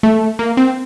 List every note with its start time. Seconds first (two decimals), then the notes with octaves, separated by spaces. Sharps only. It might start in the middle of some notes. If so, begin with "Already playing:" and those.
0.03 A3
0.39 A#3
0.57 C4